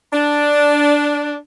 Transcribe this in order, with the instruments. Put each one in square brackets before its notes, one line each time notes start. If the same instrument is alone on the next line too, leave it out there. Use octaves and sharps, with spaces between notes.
[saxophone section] D4